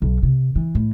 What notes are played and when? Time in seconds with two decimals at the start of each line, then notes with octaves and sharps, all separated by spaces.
0.02 B1
0.23 C3
0.56 E3
0.75 A2